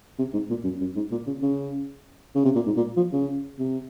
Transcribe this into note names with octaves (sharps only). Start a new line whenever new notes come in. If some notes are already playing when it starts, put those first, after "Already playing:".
C3
G#2
A#2
F#2
F#2
G#2
A#2
C#3
C#3
C#3
C3
A#2
G#2
A#2
F3
C#3
C3